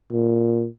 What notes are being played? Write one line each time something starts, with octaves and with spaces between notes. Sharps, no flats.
A#2